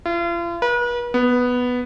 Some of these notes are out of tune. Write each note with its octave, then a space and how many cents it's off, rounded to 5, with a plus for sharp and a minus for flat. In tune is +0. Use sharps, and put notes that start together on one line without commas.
F4 -40
B4 -40
B3 +0